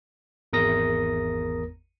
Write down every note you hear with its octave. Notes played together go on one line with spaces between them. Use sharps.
G#1 E2 A#4 D#6 A#6